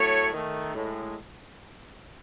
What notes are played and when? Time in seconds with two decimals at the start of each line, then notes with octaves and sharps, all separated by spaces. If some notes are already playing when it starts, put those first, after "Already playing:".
Already playing: A2 F#3 A3 C#5
0.33 D#3 A3
0.74 A2 G#3